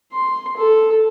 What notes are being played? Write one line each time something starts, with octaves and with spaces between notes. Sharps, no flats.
C6
A4